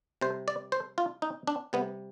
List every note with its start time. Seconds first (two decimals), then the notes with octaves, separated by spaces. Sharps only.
0.21 C3 G3 C5
0.48 D5
0.72 C5
0.98 F4
1.22 D#4
1.47 D4
1.73 C3 G3 B3